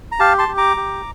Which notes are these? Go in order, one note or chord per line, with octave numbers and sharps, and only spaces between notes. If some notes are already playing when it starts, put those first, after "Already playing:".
A#5
G4 F5 A5
A5 C6
G4
A#5 D6
G4